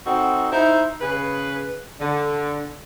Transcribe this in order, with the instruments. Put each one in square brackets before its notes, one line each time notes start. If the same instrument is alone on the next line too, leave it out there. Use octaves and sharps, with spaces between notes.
[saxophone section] C4 D#4 F#4 A4
D#4 E4 C5
C#3 G#4 B4
D3